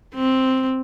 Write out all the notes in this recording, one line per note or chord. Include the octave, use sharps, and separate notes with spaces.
C4